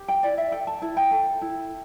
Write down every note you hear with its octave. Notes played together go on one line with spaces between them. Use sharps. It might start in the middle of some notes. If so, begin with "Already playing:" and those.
Already playing: G4
G5
E4 D5
E5
A4 G5
A5
E4 A5
G5
A4
E4